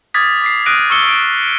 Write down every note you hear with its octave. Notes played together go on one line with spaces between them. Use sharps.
D6 D#6 F6 G#6 A6 B6
D6 B6 C7
D#6 F6 F#6 A#6 D7 D#7
C#6 D#6 E6 C#7 G7
D7